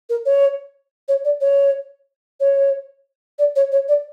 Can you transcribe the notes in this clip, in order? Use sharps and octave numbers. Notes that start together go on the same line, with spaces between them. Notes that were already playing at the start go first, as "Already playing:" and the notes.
A#4
C#5
C#5
D5
C#5
C#5
D5
C#5
C#5
D5